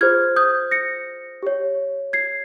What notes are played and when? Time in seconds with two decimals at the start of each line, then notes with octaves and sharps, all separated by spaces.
0.01 F4 G#4 C5 F6 G#6
0.36 D#6 G6
0.71 A#6 C#7
1.43 G4 C#5
2.13 G#6 C7